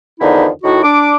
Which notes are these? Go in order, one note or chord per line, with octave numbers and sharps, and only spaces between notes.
E2 D3 D#3 F3 D#4 E4
A2 D#3 F#4
D4 D6